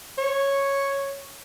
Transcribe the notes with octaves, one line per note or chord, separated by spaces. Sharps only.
C#5